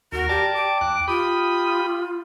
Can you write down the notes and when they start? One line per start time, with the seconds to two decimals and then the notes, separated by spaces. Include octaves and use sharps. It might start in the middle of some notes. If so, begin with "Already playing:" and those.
0.12 D#2 F#4 A#4
0.29 G4 D5 A5
0.55 G5 D6
0.81 E2 F#6
1.08 F4 G4 B5 D#6